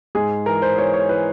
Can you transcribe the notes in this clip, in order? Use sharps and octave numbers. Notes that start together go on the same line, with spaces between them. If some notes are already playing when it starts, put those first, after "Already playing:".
G#2 G#4
E3 A#4
C5
E3 C#5
C#5
E3 B4